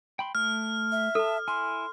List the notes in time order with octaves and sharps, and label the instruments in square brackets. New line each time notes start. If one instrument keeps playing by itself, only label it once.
[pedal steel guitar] G5 B5 C6
[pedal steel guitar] A3 [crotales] F6
[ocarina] E5
[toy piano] A4 [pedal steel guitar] A5 E6
[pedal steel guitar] E4 G#5 [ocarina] C6